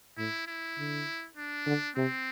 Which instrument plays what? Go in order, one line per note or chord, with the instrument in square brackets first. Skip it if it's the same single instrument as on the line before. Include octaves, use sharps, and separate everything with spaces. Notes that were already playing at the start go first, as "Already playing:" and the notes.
[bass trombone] A2 [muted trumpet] E4
[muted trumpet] E4
[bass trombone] D3
[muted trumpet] D4
[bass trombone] D3
[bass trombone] C3 [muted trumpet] C4